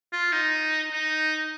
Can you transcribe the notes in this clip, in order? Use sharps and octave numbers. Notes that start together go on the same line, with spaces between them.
F4
D#4
D#4